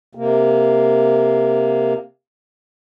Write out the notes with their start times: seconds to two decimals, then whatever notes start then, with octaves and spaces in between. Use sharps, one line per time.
0.15 C3 A#3